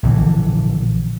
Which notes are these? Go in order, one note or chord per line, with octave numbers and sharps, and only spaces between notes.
A#1 D3 E3